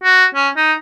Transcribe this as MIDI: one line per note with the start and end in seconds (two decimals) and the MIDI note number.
0.03 0.25 66
0.35 0.49 61
0.56 0.73 63